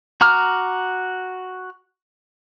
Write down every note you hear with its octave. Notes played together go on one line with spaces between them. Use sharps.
F#4 A#5 D6 F6